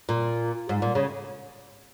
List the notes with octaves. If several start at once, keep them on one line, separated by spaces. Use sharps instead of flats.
A#2
G#2
A#2
C#3